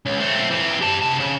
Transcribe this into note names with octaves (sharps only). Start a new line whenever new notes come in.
C#2
A3 C4
E3 C4
G4 A5
C3 A5
C#3